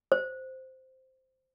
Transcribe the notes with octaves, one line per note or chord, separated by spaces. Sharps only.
C5